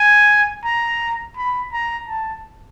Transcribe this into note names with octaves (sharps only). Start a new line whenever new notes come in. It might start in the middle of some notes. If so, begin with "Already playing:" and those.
Already playing: G#5
A#5
B5
A#5
A5